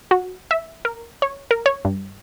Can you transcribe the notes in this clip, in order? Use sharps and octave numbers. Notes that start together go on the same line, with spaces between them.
F#4
E5
A#4
C#5
A#4
C#5
G2